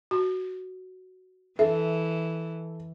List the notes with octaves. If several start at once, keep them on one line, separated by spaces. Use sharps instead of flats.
F#4
E3 A4 E5